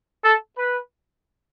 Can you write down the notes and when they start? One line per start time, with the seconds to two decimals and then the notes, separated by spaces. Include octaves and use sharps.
0.23 A4
0.57 B4